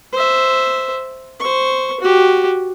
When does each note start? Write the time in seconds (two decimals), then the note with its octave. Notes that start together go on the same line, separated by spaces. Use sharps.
0.13 C5 E5
1.40 C5 C#6
2.00 F#4 G4